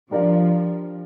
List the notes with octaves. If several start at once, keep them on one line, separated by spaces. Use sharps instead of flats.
F3 G3 D4 A#4 D5 F5